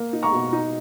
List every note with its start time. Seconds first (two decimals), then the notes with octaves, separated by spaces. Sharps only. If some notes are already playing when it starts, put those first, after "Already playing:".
Already playing: A#3
0.13 D#4
0.23 A#5 C#6
0.32 B2
0.53 D#4